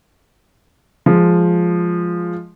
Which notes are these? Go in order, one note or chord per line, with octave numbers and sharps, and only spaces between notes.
F3 G#3